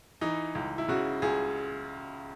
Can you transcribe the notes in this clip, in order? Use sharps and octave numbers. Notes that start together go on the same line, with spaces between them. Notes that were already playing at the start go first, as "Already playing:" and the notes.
E3 D#4
C#2
E4
C#3 F#4
C#2 G#4